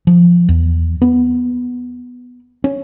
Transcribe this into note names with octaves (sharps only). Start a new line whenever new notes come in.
F3
E2
B3
C#4